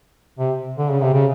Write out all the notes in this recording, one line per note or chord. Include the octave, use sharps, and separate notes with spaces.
C3
D3
C#3
C3
C#3